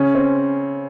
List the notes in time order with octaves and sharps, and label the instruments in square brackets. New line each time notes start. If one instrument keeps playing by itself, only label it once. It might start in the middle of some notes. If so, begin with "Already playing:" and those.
Already playing: [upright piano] C#3 [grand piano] C#4
[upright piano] C4